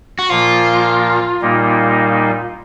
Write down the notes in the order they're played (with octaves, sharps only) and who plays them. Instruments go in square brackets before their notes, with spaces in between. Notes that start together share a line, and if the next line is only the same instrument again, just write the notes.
[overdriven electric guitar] F#4
[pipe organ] A#2 F3 A#3 [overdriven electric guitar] F4
[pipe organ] A#2 G3 A#3 D#4